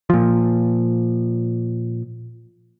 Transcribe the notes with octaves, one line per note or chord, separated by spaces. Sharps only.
A#2 F3